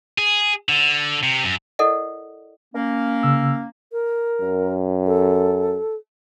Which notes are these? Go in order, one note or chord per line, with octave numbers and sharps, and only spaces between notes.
G#4
D3
C3
F#2
E4 A4 A#4 D5 D#5 F#5
A#3 C#4
C#3 E6
A#4
F#2
A4